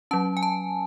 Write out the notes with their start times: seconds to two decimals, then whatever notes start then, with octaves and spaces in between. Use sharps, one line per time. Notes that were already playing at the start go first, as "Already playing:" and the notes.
0.11 F#3 C#4 A5
0.37 G#5
0.43 A5